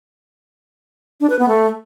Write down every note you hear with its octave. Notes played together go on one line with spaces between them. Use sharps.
D4
B4
B3
A3